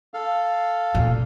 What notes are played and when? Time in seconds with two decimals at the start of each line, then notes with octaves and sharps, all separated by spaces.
0.14 A4 F5
0.95 A#2